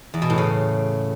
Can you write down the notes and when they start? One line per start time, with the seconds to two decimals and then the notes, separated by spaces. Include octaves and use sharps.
0.14 E2
0.22 B2
0.30 A2
0.38 C#3